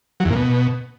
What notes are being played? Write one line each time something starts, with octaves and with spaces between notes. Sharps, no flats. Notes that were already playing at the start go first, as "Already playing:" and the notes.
F#3
E2
A#2
B2